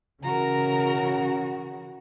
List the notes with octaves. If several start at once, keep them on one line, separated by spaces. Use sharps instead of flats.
C#3 E3 F#4 A#4 A#5